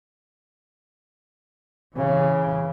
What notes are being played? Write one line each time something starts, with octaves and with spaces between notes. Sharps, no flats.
C#3 E3